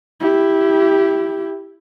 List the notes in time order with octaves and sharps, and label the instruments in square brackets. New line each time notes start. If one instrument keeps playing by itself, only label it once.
[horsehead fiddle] E4 G4